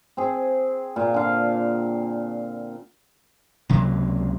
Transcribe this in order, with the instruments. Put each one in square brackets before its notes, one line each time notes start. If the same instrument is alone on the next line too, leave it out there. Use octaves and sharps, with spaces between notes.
[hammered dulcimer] C4 G#4
A#2
D3 F5
[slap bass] C#2 C3 F#3 A#3